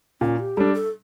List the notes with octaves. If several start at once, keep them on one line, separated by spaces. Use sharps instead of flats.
A#2 C#4
G4
G3 D4 A4
A4